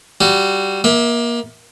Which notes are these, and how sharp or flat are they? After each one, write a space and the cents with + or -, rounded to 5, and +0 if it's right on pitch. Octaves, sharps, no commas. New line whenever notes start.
G3 -10 F#4 -5
A#3 +25 E5 -25